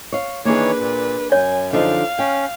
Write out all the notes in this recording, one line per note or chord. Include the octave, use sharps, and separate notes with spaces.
C#5 F5
D#3 E3 A#3 D4 G#4 B4 C#5
A#2
F#2 C#5 G#5
D3 F3 D#4 F5
C#4 G5